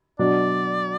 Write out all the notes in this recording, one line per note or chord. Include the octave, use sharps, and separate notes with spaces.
B2 F#3 D4 D5